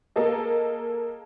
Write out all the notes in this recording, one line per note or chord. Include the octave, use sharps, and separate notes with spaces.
A#3 G#4 A4 D#5